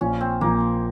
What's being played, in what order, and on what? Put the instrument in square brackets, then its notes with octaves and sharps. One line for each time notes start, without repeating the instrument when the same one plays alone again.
[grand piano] A#1 A#2 F3 [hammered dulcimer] C#4
[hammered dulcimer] C4
[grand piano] A#1 A#2 F3 [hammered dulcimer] A#3